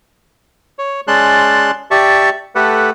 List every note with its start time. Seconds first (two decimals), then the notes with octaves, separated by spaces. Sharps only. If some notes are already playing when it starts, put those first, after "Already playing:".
0.79 C#5
1.08 G#3 C#4 D5 A5 C6 F#6
1.91 G4 D5 E5 A5 C#6
2.55 A3 G4 A4 B4 F#5